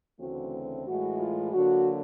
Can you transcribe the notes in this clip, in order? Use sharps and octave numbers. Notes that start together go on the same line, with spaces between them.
D2 C#3 E3 A3 C4 F#4
A2 E3 G#3 F#4
F4
D3 F#3 A#3 F#4